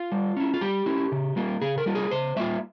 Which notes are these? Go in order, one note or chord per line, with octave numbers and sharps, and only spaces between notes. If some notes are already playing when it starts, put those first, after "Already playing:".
Already playing: F4
G3
C#4 E4
F4
G3 G4
C#4 E4
C#3
G3 A#3 F4
C#3 G#4
A#4
G3 A#3 F4
G#4
C#3 C5
G3 A#3 F4 E5